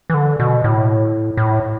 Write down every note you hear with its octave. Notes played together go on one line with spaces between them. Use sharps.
E3
D3
B2
A2
A2